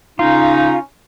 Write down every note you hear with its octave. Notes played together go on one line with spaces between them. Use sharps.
C#3 C#4 D#4 F4